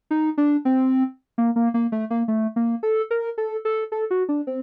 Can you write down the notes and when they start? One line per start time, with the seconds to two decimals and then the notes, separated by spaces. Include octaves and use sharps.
0.11 D#4
0.38 D4
0.65 C4
1.38 A#3
1.56 A#3
1.74 A#3
1.92 A3
2.10 A#3
2.28 A3
2.56 A#3
2.83 A4
3.11 A#4
3.38 A4
3.65 A4
3.92 A4
4.11 F#4
4.29 D4
4.47 C4